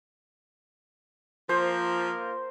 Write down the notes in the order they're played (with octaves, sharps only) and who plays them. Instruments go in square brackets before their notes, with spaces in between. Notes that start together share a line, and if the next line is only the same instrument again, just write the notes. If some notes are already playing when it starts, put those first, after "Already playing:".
[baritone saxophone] F3 [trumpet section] A#3 F4 A#4 [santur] C5